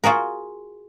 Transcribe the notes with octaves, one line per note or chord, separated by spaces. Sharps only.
F4 F#4 G#4 A#4